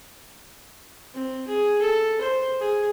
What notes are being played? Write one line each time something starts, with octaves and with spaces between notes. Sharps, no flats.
C4
G#4
A4
C5
G#4